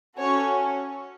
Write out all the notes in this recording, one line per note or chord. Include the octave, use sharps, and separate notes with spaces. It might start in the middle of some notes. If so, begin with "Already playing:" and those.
C#4 F#4 A4 C#5